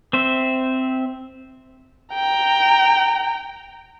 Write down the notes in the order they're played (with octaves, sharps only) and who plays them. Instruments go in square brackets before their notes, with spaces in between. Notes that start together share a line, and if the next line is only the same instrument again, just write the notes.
[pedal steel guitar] C4 C5 E5
[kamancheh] G5 A#5